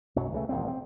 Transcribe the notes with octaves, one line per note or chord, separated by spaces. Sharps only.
B1 F#2 F#3
C#2 C#3 A3
D#1 A1 F2 C4
C4